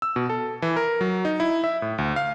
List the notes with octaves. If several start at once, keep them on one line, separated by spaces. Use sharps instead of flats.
E6
B2
A4
E3
A#4
F#3
D#4
E4
E5
A2
D2
F5